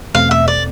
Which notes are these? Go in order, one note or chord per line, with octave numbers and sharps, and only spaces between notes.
E2 B2 A3 C4 F5
E5
D5